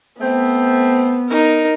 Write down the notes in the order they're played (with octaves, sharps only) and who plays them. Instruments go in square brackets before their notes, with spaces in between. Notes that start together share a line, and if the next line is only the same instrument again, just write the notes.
[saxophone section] A3 C4 [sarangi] B3
[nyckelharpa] D#4 A#4